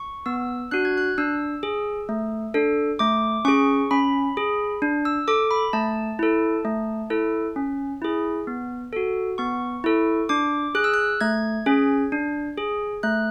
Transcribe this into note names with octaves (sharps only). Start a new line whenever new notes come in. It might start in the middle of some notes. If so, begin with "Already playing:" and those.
Already playing: C#6
B3 E6
D4 F#4 F#6
G#6
F#6
D4 E6
G#4
A3
D4 A4
A3 D6
C#4 G#4 C#6
C#4 B5
G#4
D4
E6
A4 D6
B5
A3 A5
E4 A4
A3
E4 A4
C#4
E4 G#4
B3
F#4 A4
B3 C#6
E4 A4
D4 D6
G#4 F#6
E6
F#6
A3 G#6
C#4 G#4
D4
G#4
A3 F#6